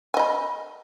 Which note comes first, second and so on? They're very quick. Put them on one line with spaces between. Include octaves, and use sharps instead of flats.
G#5 D#5 B5